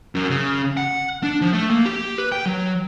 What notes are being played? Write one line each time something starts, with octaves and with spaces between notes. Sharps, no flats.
F#2
C#3
F#5
D4
F3
A3
A#3
G4
B4
G5
F#3